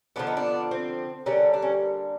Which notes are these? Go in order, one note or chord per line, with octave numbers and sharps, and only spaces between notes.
D3 F3 G#3 B3 D4
D#4
D4
C4
D3 G3 A#3 C#4
D4
C#4